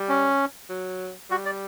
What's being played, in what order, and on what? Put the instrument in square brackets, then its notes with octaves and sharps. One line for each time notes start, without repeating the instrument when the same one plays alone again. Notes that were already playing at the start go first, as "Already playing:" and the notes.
Already playing: [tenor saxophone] G3
[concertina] C#4
[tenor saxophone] F#3
[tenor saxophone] G3 [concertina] F#4
[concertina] D5